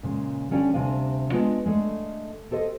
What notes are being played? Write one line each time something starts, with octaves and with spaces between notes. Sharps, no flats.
A#2 C#3 G#3
D3 G3 C#4 D4 D5 G5
D2 C3 G3 D4 F5 G#5
G#3 B3 D4 F4
G#3 A3 D4
G4 A4 C5 C#5 D#5